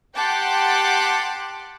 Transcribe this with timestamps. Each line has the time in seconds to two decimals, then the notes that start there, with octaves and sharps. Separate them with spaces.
0.16 G4 F#5 G5 A5 C6 D6